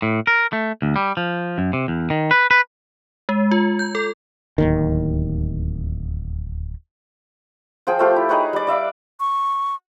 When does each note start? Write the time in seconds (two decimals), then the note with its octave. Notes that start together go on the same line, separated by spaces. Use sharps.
0.02 A2
0.27 A#4
0.53 A3
0.82 D2
0.96 G3
1.17 F3
1.58 F#2
1.73 C3
1.88 E2
2.10 D#3
2.31 B4
2.51 B4
3.29 G#3
3.51 F4
3.79 G6
3.95 A4
4.58 D1 D#2 D#3
7.87 F3 F4 G#4 G5
7.99 A3 F4 G4
8.16 E4
8.29 D#4 G#4 B4 C#5
8.53 G3 D5
8.67 D5 E5 F5 D6
9.20 C#6